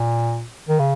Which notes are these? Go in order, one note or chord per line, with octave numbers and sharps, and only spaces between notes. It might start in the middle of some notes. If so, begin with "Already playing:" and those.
Already playing: A#2
D#3
C#3